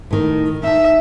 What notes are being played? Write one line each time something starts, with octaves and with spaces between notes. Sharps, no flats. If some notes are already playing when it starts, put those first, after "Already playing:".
A2 D#3
D#4 E5 A5